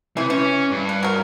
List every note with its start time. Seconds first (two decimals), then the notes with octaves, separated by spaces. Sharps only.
0.17 C3 E3 E4
0.30 E3 C#4
0.71 G2
0.89 B4
1.03 F#3 A#4